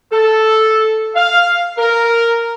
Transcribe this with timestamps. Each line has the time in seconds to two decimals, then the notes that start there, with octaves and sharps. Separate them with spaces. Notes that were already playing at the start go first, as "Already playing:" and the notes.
0.12 A4
1.15 F5
1.78 A#4